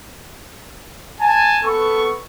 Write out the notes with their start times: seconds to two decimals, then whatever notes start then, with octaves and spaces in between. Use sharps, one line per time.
1.20 G#5 A5
1.64 B3 A4 C#6